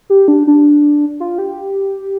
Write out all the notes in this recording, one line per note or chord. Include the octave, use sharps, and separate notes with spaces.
G4
D4
D4
F4
G4